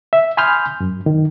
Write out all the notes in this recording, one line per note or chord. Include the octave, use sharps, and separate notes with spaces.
E5
G#5 B5 C6 D#6 F6 G6
F#2
D#3